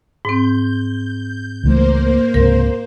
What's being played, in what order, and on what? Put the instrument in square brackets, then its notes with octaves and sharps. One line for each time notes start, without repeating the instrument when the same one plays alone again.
[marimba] G#2 C4 [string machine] G6
[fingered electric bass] C#2 E3 A3 [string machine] A#3 C5
[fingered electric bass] C#2 G#2 C3 [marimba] A#4